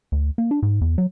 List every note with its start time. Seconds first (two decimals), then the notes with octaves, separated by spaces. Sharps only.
0.12 D2
0.38 A#3
0.51 D4
0.63 G#2
0.81 E2
0.98 F#3